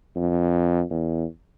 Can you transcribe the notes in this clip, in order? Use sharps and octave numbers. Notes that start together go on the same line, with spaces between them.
F2
E2